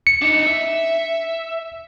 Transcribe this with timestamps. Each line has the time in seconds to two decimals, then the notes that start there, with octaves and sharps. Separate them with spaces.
0.07 C#7
0.22 D4 D#4
0.47 E5